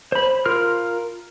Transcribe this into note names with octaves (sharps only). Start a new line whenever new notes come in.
C5 B5
F4 A#4 F6